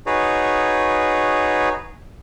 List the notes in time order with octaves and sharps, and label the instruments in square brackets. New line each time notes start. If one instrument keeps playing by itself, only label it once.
[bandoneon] D#4 F#4 G#4 B4 C#5